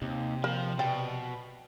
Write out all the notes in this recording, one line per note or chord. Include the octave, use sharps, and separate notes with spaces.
D#2 C3
F3 A#4
B2 D5 G5